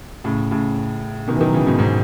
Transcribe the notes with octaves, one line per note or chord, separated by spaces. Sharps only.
A2 C#3
A2 C#3
B2 D#3
E3
D#3 F#3
C#3 E3
G#2 B2
G#2 B2